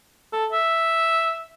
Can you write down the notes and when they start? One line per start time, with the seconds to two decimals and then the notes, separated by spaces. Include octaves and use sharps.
0.33 A4
0.52 E5